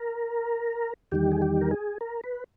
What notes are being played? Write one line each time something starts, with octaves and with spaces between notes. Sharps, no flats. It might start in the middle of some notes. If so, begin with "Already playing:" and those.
Already playing: A#4
E2 D#3 G3 G4
G#4
G4
A#4
G#4
A#4
B4